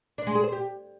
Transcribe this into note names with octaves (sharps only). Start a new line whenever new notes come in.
D4
G#3
G#4
C5
G4